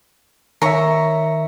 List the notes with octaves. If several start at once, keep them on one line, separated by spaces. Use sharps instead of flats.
D#3 C#5 E5 A#5